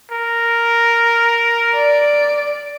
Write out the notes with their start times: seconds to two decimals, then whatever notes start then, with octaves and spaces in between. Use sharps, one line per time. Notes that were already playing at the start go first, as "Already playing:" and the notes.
0.11 A#4
1.75 D5